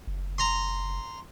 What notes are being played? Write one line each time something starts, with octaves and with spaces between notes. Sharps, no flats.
F#1
A#5 C6